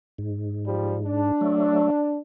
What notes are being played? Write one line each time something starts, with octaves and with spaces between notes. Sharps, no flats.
G#2
F3 G3
D4
F#3 A3